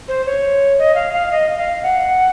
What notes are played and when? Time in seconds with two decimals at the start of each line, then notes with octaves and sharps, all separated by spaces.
0.08 C5
0.26 C#5
0.79 D#5
0.95 F5
1.13 F5
1.31 D#5
1.58 F5
1.83 F#5